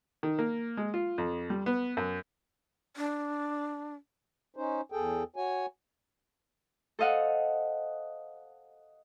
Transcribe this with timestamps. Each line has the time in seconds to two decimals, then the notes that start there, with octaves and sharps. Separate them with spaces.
0.23 D#3
0.39 A#3
0.77 G#3
0.94 F4
1.18 F2
1.50 G3
1.66 B3
1.97 F#2
2.97 D4
4.56 C#4 D#4 C5
4.92 E2 G#4 A4 G5
5.36 F#4 C#5 G#5
6.99 A4 C5 D#5 F5 F#5